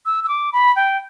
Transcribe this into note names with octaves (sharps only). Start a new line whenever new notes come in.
E6
E6
D6
B5
G5